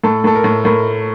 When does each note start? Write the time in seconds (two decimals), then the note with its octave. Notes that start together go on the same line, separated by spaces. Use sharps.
0.04 A2 A4
0.24 A2 A4
0.35 A#4
0.44 A2
0.65 A2 A#4